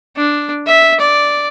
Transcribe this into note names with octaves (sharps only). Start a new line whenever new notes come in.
D4
E5
D5